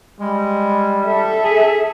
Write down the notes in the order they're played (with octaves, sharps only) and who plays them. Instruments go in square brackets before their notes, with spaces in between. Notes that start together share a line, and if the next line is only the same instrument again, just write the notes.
[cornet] G3 [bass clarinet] G#3
[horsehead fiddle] A4 E5
[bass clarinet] G#4